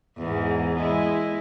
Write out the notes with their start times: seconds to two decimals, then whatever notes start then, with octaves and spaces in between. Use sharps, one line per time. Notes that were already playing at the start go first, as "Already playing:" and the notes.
0.18 E2 G#2
0.76 G#3 E4